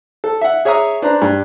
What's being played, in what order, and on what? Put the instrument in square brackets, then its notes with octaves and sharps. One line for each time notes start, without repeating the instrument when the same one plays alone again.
[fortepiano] A4
E5 F#5
G#4 C#5 E5 A#5 D#6
D4 B4 C5 A#5
G2